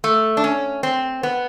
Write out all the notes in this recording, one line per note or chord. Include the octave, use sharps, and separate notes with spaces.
A3
D4
C#4
C4
B3